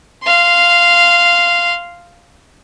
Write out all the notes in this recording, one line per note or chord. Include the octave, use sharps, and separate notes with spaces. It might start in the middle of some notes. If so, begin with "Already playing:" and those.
F5 C6